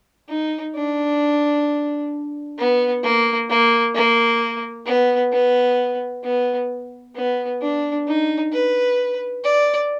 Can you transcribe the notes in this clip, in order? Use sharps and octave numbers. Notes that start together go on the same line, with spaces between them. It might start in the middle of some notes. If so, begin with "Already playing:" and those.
D#4
D4
B3
A#3
A#3
A#3
B3
B3
B3
B3
D4
D#4
B4
D5